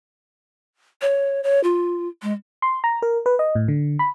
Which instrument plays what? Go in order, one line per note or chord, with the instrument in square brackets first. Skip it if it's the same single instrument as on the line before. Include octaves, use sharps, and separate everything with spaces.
[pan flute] C#5
C#5
F4
G#3
[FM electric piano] C6
A#5
A#4
B4
D#5
A2
D3
B5